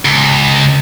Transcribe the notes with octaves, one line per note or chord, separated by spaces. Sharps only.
C#2